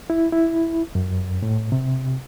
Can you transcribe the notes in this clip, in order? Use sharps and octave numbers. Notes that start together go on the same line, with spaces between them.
E4
E4
F#2
A2
C3